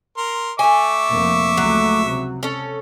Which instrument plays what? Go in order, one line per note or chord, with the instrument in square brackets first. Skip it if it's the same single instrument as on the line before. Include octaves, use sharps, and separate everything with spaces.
[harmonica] A#4 C6
[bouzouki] A3 G#5 [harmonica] E5 C#6 D6
[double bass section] F1 A#3
[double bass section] C#2 A3 [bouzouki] F#3
[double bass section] C3
[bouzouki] C#4 A4